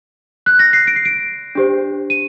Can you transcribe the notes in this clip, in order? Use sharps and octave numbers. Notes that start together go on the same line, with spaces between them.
F#6
A#6
C7
D7
C7
D7
D4 G4 C5
D#7